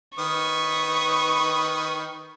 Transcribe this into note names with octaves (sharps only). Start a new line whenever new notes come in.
D#3 B4 C#6 D#6